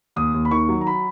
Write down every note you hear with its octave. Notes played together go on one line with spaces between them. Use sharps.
D#2 D#6
D#2
B5
D#3 C#6
F#3
A#5
B5